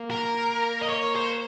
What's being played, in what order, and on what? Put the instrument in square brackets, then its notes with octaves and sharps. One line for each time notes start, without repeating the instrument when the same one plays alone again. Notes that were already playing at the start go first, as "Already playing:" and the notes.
Already playing: [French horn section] A#3
[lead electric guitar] A#4
D#5
C#5
C5